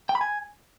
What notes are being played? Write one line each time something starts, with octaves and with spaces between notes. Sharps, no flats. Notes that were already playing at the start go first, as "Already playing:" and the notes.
G5
B5
G#5